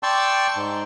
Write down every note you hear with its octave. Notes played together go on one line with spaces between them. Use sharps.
D5 G5 A5 C6 C#6 E6
G#2